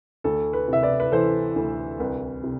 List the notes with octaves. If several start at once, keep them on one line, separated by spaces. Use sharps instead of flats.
D2 A4
B4
C3 E5
B4 D5
B4
E3 A4 C5
D2
C2 B4
C3